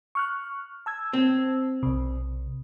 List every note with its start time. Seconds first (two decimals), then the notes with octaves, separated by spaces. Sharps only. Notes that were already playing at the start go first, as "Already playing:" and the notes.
0.15 C#6 F6 F#6
0.86 A5 E6 G#6
1.13 C4
1.83 B1 C3